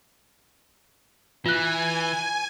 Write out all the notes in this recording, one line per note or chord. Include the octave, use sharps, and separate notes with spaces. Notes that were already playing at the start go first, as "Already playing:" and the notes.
E3 F4 G#5 F#6